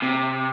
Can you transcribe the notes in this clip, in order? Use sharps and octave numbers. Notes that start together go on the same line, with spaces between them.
C3